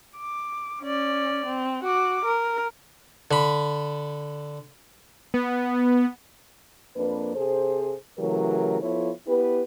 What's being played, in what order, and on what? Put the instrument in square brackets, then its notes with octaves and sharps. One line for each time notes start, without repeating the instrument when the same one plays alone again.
[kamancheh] D6
C#4 D5
C4
F#4 D6
A#4
[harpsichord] D3 B5
[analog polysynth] B3
[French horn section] F2 A#3 D4 B4
C3 G#4 A4 C5
C#3 E3 F#3 A3 G4 A#4
F3 B3 E4 F4 A4 C#5
B3 E4 G4 B4